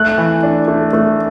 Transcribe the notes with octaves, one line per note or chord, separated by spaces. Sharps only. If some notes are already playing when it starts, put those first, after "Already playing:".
Already playing: A3 F#6
E3
D4
A3
A3